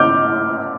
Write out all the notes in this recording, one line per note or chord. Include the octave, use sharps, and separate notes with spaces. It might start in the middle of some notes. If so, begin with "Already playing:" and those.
Already playing: D6 F6 G6